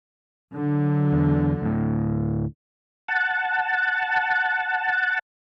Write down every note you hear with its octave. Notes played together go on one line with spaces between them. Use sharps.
D3 F#3
E2
D2 A2
F#5 A5